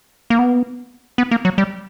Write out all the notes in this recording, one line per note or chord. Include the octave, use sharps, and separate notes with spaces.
A#3
B3
B3
A#3
F#3
G3